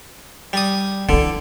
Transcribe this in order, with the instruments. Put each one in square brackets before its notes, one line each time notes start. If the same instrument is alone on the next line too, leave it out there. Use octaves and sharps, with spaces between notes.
[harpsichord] G3 D#6
[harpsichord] D3 [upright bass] E3 E4